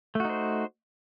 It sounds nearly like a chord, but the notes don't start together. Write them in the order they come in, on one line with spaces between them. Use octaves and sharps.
A3 F#4 D#4 C5